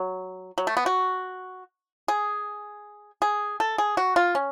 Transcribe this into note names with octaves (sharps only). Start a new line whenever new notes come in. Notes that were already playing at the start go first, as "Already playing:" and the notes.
Already playing: F#3
F#3
A3
B3
F#4
G#4
G#4
A4
G#4
F#4
F4
C#4